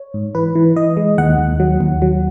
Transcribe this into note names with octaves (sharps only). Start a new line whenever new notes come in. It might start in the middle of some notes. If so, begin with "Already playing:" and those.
Already playing: C#5
G#2
E3 B4
E3
E3 D#5
G#3
D#2 F#5
D#2
F#3
D#2
F#3